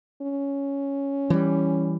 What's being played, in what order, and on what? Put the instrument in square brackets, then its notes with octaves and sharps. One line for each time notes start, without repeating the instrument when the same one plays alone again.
[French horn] C#4
[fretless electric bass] E3 G3